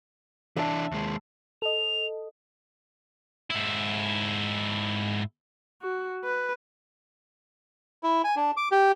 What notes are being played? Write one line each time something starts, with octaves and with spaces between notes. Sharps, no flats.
E3 D4 E5 A5
D#2 G#3
A4 D#5 F7
G#2 E4
F#4
B4
E4
G#5
D4
D6
G4